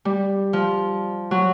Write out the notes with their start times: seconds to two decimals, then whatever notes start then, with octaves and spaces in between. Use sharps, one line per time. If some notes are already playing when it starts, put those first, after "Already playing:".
0.05 G3
0.53 F3
1.31 F#3